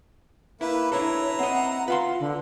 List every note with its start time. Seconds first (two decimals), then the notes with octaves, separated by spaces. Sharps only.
0.61 A#3 E4 B4 E5
0.92 D4 E4 A4 B4 C#5 E5 A#5
1.39 C4 D#5 F#5
1.88 F4 B4 F5 C6
2.20 D3